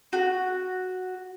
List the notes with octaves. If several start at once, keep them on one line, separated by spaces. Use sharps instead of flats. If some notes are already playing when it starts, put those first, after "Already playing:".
F#4